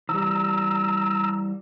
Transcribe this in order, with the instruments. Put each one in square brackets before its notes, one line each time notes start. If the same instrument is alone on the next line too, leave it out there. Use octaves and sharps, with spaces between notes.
[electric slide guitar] E3 G3 [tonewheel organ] A#5 E6